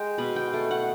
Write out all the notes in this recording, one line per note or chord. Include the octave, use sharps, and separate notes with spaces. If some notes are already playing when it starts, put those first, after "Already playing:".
Already playing: G#3 G5
B2 B5
G5
A3
F#5